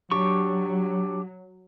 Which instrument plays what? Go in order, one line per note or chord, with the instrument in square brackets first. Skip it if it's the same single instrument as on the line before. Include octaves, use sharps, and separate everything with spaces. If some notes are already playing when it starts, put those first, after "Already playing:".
[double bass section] F#3 [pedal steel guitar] D4 G4 C#6